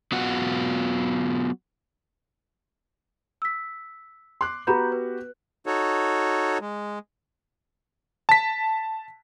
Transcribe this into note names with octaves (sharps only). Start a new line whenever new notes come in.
F#3 B3 F4 F#4 F#5
E6 B6
C6 D6 F#6
B3 F#4 G4 A#5 B5 G6
B4
D#4 F#4 A4 C#5
G#3
A5 B6